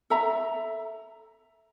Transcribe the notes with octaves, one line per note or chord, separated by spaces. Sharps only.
A4 E5 A#5